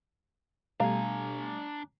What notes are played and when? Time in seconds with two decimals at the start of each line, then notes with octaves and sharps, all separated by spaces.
0.80 B2 G3 A3 D4 F5 G#5 A#5